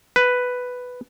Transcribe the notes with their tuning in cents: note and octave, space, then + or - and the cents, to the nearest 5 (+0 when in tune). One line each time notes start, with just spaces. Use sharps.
B4 +5